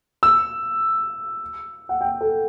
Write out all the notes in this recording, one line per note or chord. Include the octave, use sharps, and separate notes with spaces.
E6
F#5
G5
A4